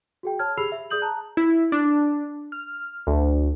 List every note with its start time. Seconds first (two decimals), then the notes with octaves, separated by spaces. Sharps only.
0.23 F#4 G#4 G5
0.39 C#5 A5 F6 G#6
0.57 G4 G#4 B5 E6 C7 F7
0.72 E5
0.90 G#4 D5 D#6 G6 F#7
1.02 A5 A#5 F#6
1.37 E4
1.72 D4
2.52 F6
3.07 D2